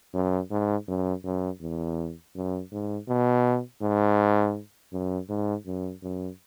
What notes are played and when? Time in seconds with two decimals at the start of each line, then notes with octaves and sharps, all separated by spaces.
0.14 F#2
0.51 G#2
0.88 F#2
1.24 F#2
1.61 E2
2.35 F#2
2.72 G#2
3.08 B2
3.82 G#2
4.93 F#2
5.29 G#2
5.66 F#2
6.03 F#2